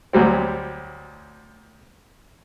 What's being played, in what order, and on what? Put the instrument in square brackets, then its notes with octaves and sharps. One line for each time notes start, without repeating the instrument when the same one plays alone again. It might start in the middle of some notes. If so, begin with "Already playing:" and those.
[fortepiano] D2 F#3 G3 C4